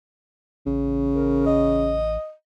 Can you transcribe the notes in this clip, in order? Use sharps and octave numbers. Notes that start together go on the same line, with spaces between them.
A1 C#3
A#4
D#5